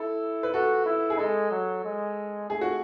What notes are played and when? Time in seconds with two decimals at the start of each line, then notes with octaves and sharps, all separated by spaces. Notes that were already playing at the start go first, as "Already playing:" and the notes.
Already playing: E4 A4
0.43 B4
0.54 F#4 A4
0.86 E4
1.10 G#4
1.19 G#3 A4
1.51 F#3
1.84 G#3
2.50 A3 G#4
2.61 F#4